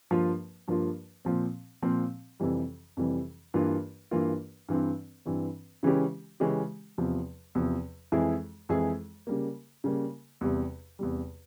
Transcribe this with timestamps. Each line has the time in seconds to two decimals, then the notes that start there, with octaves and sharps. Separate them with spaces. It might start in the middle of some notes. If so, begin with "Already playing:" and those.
0.11 G2 F3 A#3 F4
0.67 G2 F3 A#3 F4
1.25 A#2 F3 C4
1.83 A#2 F3 C4
2.40 F2 C3 E3 G3
2.97 F2 C3 E3 G3
3.54 G2 E3 A#3 F4
4.11 G2 E3 A#3 F4
4.69 G2 E3 G3 C4
5.26 G2 E3 G3 C4
5.83 C#3 E3 G#3 C#4 G4
6.40 C#3 E3 G#3 C#4 G4
6.98 E2 C3 F3
7.55 E2 C3 F3
8.12 F2 E3 G#3 E4 G#4
8.69 F2 E3 G#3 E4 G#4
9.27 C#3 G3 A#3
9.84 C#3 G3 A#3
10.41 E2 C3 G3
10.99 E2 C3 G3